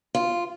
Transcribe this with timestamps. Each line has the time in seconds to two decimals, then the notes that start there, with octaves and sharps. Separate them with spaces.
0.15 F4